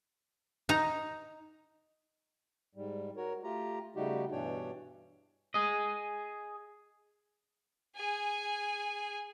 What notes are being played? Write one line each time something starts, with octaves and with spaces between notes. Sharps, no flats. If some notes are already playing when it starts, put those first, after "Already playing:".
D#4 A#5
G#2 G3
F#4 A#4 C#5
A3 F4 G4 A#5
C#3 G3 A3 D#4 F#4 G4
G2 B2 E3 D4 C#5 G5
G#4 D#5
G#4 G#5